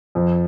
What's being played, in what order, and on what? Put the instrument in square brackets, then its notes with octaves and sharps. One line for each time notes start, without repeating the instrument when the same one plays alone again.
[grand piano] F2